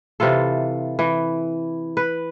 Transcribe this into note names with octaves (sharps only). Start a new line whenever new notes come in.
C3 E3 F4 A4
E3
B4